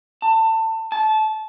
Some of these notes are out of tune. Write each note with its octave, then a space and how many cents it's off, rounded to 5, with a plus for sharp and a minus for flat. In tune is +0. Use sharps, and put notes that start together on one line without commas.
A5 +25
A5 -20